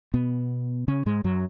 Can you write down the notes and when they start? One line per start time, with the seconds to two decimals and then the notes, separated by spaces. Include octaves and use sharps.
0.14 B2 B3
0.88 C#3 C#4
1.06 G#2 G#3
1.24 F#2 F#3